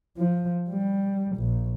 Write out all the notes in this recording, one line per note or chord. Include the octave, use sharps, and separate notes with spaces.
F3
G3
A#1